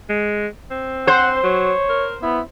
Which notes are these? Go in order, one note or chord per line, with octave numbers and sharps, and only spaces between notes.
G#3
C4
C5 F#5
F#3 C#5
A#4
B3 E4